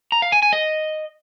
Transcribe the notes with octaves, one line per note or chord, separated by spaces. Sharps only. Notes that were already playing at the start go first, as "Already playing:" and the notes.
A#5
F5
G#5
G#5
D#5